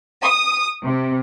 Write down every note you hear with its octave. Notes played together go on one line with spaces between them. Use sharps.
D#6
C3